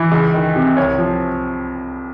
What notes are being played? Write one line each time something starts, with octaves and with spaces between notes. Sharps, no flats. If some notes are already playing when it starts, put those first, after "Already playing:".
Already playing: E3
C#2
D#3
C3
C2 C#5
F3